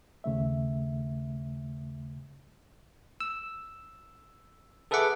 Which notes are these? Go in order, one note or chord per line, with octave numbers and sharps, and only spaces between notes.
D#2 C#3 A3 E5
E6
G#4 A4 B4 E5 F#5 D6